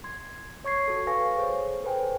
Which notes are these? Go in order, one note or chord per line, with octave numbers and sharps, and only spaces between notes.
C6 G#6
C#5 C#6 G#6 C7
F#4 A4
A4 B4 F5 G#5 C#6 A#6
G#4 C5 C#5
A4 B4 C5 G5 G#5